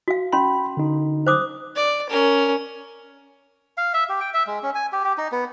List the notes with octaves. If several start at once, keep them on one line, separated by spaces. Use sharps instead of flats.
F#4 F5
C#4 B5 C6
D3 D#4
C5 D6 D#6
D5
C#4 A#4
F5
E5
G4
G5
E5
G#3
C#4
G#5
G4
G4
D#4
B3